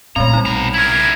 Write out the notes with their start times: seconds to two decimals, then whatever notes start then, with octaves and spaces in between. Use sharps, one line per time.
0.16 A#2 D3 G#3 A3 C4 A#5
0.33 B1 G3 D#4
0.45 B2 A#5 B5
0.74 E4 A#4 G#6